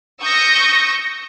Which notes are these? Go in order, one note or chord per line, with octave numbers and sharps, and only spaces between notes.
C#6 D#6 E6 G6 A#6 C#7